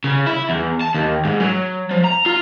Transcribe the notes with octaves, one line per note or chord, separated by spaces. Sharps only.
C#3
E4
E2
A5
D#2
G#2
F#3
F3
A#5
F4